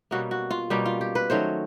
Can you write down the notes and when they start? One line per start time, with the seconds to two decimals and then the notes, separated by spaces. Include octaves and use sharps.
0.11 B2 G3 A#3 C#4 F#4
0.31 F#4
0.51 F4
0.70 B2 G3 A#3 C#4 G4
0.86 F4
1.01 G4
1.15 B4
1.30 D#3 F#3 A3 C#4 C5